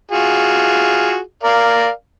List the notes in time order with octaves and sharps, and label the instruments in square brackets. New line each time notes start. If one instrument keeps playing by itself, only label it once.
[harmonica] F4 F#4 G#4
A#4 D5 F5